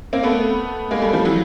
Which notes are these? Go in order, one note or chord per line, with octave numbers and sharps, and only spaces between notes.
A#3 C4
A3 B3
G#3 A#3
G3 A3
F3 G3
E3 F#3